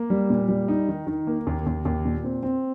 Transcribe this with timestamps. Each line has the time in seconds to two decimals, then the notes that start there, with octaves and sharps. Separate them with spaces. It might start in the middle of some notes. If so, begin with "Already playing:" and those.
Already playing: A#3
0.10 G3
0.30 A#2
0.48 G3
0.68 D#4
0.89 D#3
1.07 D#3
1.27 A#3
1.47 D#2
1.66 D#2
1.85 D#2
2.05 A#2
2.24 C4
2.43 C4